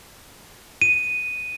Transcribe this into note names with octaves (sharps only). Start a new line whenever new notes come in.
D#7